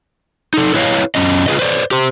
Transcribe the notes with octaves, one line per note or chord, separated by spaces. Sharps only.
D#4 A4
E4 B4 C#5 D#5 F5
F#2 C#4 D#5
F4 G#4 B4 D#5
B4 C5 D5
G4 C5